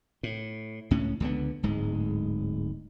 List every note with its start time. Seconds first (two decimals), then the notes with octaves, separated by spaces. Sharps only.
0.23 A2
0.91 C#2 A2 C#4
1.20 C#2 D3 B3
1.63 D1 G#2 G#3